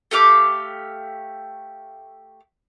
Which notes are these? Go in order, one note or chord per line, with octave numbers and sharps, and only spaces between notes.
A3 G4 F5 D6